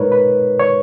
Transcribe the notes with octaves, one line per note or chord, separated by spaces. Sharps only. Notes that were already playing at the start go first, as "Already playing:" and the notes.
Already playing: A#2 G#3 D#4 A#4 B4 C#5
B4
C#5